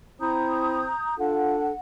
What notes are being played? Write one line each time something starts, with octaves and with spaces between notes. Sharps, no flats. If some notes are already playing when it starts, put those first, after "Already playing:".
C4 E4 A#5 D#6 G6
D4 F4 A4 F#5